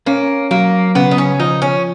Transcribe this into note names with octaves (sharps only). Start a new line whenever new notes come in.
A#3 C#4
F#3 A#3
C#3 B3
D#4
C#4
F3 D#4
C#4